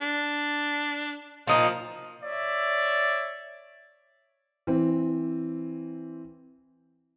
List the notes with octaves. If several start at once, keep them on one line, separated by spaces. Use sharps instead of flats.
D4
A#2 F3 D#4 F4
C#5 D5 E5
E3 C4